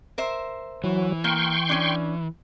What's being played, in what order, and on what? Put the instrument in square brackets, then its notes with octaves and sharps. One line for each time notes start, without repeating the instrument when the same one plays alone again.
[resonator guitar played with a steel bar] A#4 C5 E5
[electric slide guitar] E3 [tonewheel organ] F#3
[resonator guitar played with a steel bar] A#3 [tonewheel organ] G5 C6 C#6
[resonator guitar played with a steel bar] C#4 D4